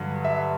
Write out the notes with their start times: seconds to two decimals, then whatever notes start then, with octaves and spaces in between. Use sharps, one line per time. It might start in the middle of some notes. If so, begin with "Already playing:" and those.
Already playing: G2 D3 F#3
0.24 E5